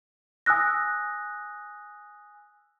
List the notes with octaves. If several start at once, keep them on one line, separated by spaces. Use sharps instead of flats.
G#5 D#6 E6 F#6 A#6